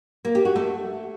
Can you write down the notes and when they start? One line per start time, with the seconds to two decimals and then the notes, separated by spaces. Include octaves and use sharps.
0.25 A#3
0.35 G4
0.45 F#4
0.56 A3